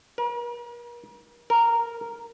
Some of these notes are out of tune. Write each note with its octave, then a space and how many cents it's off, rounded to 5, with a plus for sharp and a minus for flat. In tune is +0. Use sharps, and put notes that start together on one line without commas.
A#4 +40
A#4 -10